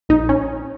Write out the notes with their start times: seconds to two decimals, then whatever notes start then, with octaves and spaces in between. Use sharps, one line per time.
0.09 A#1 D#4
0.29 C#4